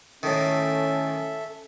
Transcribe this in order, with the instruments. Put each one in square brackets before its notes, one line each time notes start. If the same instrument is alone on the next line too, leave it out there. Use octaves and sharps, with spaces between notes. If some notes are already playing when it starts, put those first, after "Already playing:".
[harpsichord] A2 D#3 [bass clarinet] C#4 [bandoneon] A4 E5